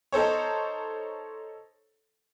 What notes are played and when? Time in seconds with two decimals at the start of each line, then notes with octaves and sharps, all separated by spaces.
0.12 D#4 A4 C5 C#5